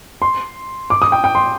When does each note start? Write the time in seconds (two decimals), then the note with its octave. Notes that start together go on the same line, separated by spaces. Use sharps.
0.22 C6
0.90 D6
1.02 D#6
1.12 G5
1.24 G5
1.35 C6